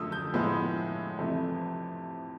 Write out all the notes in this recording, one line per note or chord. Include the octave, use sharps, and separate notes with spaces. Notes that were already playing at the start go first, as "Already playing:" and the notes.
Already playing: F#2 D3 F3 A3 D#6 E6
G6
A2 F3 G#3 B3
F2 C3 E3 A3